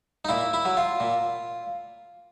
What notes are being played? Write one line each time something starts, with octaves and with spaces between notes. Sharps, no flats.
D#4
A#2 E4
E4
F#3
F4
A#2